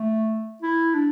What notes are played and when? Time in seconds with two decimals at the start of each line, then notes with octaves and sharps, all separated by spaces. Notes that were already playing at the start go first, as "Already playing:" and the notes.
Already playing: A3
0.62 E4
0.95 D4